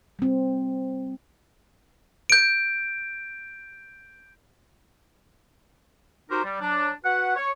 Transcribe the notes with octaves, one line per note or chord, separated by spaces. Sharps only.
G3 C4
G6 D7
D#4 F#4 G4 A#4 C5
G3
F#3 D4
F#4 B4 F#5
C#5